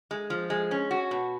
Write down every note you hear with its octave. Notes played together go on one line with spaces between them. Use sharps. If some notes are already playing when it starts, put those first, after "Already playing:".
G#3
F3
G#3
C#4
F#4
B2